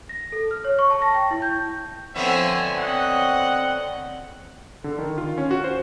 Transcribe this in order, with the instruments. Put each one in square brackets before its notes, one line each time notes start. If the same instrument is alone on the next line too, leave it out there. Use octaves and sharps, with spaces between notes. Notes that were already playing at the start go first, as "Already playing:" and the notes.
[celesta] A#6
A4
F6
C#5
C#6
A5
A#6
G5
E4
G6
[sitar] D3 B3 [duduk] F3 [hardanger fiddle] C4 G#5 [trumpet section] C#5 E5
[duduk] C4 [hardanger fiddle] C#5 D#5 [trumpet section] F#5
[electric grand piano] D3
D#3
F4
C#4
F#4
C5